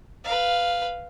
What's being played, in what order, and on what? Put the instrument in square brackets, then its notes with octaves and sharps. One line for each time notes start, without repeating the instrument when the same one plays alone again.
[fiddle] B4 F5